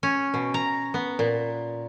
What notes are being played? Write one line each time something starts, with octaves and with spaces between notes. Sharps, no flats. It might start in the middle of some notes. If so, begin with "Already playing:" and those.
C#4
B2
A#5
B3
A#2